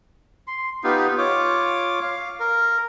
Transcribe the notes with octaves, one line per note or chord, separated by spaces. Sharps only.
C6
B3 D#4 F4 G4
F4 C#5 D6
F5
A#4